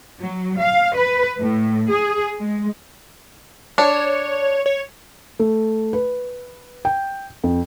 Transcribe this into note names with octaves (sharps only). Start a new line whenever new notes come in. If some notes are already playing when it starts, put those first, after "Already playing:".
F#3
F5
B4
A2
G#4
G#3
D4 C#5
C#5
A3
B4
G5
F2